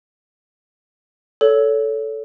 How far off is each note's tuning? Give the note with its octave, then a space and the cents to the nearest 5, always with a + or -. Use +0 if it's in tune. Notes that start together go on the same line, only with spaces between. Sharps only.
A4 +0 C#5 +25